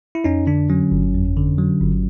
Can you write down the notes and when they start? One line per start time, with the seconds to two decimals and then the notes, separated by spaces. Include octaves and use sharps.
0.15 E4
0.24 F2 C#4 D#4
0.47 D3 D4
0.70 F#3 C#4
0.92 G1
1.14 F2
1.37 D3
1.58 F#3
1.80 G1